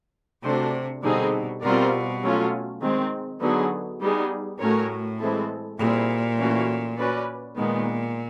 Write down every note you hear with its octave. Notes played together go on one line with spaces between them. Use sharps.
C3 A3 D4 F#4 A4 C5
B2 D3 G3 C4 D#4 G#4
B2 G3 C4 F4 A#4 D5
F#3 A3 C#4 F4
D#3 G#3 C4
D3 F#3 B3 D#4 G#4
G3 B3 D#4 G#4
A2 A3 C#4 F#4 A#4 C#5
E3 G#3 C4 E4 A4
A#2 G3 C4 E4 G#4
E3 A3 C#4 F#4
C#4 F#4 B4 D5
A#2 D#3 G#3 B3